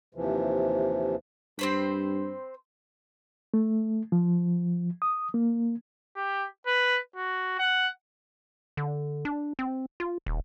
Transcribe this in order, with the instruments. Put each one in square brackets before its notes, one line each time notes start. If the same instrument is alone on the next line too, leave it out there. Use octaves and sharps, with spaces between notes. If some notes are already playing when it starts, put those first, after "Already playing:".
[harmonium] D#2 C3 E3 F3
[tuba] G2 [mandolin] C4 C5 B5
[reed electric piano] A3
F3
D#6
A#3
[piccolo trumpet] G4
B4
F#4
F#5
[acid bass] D3
D4
C4
F4
D#1